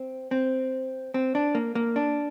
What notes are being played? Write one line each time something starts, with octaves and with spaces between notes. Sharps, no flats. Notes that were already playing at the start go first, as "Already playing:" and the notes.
Already playing: C4
C4
C4
D4
A#3
A#3
D4